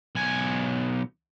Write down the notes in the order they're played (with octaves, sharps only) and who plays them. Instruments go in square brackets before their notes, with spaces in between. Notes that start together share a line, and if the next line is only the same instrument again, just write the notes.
[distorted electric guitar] B1 G#5